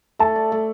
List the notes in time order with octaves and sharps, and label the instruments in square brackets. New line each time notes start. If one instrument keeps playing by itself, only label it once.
[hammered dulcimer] A3 [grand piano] A5
[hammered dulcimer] D5
A3